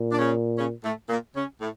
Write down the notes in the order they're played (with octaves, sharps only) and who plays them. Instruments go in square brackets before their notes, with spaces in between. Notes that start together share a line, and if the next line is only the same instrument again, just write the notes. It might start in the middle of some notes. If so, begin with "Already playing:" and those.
Already playing: [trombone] A#2
[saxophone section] D4
C#3 C#4
C#3 C#4
A2 A3
A#2 A#3
C#3 C#4
A2 A3